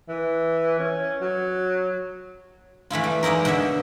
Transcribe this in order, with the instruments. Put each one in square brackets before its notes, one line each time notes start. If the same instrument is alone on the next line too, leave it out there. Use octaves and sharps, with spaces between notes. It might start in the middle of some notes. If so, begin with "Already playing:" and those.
[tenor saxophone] E3
C#4
F#3
[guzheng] E3 A3 E4 F4
G3
G#3 A#3 D#4 E4 A#4
B2 D3 C#5 E5